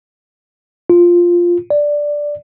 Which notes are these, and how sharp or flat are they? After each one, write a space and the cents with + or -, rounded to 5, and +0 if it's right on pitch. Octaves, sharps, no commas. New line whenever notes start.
F4 +0
D5 +0